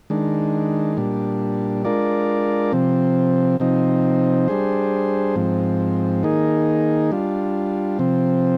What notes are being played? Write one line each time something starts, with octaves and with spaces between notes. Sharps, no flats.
D#3 G#3 D4
A#2 G3 D4
G#3 D4 F4 A#4 D5
C3 F3 C4
C3 F3 C4 D#4
G3 D4 G#4 C5
G#2 F3 C4
D#3 A#3 D#4 G#4
G3 D4 F4
C3 F3 C4